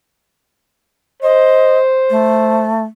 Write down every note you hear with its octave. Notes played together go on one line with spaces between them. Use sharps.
C5 D#5
A3